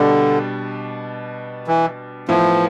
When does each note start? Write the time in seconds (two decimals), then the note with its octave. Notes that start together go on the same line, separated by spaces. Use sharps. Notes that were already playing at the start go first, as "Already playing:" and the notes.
Already playing: B2 D3 G3 D4
1.67 E3
2.28 A2 E3 F3 B3 E4